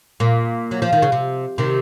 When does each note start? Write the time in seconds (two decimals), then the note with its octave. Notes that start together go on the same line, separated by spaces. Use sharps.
0.20 A#2
0.71 F#3
0.82 F3
0.93 D#3
1.02 C#3
1.12 C3
1.58 C3 D#3